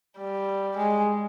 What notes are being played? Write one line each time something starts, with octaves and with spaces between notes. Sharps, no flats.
G3
G#3